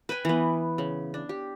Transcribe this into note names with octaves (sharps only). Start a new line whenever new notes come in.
B4 G5 G#5 B5
E3 B3
C#3
D4
G4